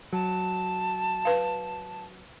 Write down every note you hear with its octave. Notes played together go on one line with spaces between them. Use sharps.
F#3 A5
B4 F5